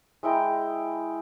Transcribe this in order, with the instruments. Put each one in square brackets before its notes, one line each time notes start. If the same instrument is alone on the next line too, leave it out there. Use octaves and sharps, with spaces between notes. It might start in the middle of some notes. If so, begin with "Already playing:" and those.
[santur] G#3 E4 G5 A#5